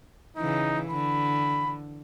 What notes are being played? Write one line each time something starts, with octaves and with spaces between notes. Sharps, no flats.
C#3 E3 D#4
D3 B5